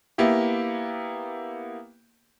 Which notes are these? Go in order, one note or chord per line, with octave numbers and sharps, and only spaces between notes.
A#3 B3 E4 G4